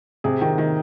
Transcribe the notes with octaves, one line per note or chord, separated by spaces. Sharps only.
C3 G#4
D#3
D#3